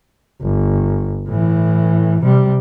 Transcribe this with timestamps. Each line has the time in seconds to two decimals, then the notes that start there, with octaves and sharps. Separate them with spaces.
0.42 G1
1.28 A2 E3
2.21 C3 G3